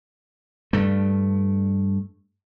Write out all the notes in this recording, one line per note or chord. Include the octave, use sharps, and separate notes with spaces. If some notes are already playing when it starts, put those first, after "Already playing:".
G2 A3